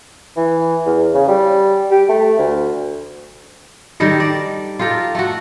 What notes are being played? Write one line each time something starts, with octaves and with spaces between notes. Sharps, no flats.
E3
E2
C#3
G3
G4
A3
D2
D#3 G3 A4 A#4
D5
F4 G4 A4 A#4
A3 F#4